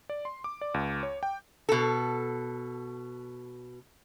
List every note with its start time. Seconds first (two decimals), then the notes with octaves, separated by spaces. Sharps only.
0.09 D5
0.25 C6
0.44 D6
0.61 D5
0.74 C#2
1.03 C#5
1.23 G5
1.69 B2 A4